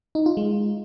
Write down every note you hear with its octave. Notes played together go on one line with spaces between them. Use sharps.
D#4
F4
G#3